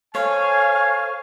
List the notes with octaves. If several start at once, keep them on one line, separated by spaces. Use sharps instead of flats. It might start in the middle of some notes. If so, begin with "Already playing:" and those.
A4 C5 C#5 F5 G#5 C#6